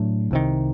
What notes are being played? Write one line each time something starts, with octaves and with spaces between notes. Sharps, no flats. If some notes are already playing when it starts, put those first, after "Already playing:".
Already playing: A2 F#3 A3 D4
C2 C3 D#3